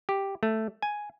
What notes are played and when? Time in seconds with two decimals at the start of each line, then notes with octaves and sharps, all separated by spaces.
0.09 G4
0.43 A3
0.82 G#5